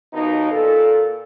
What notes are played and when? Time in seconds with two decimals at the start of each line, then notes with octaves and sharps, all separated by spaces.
0.13 D#2 B2 A#3 D#4
0.52 A#2 A4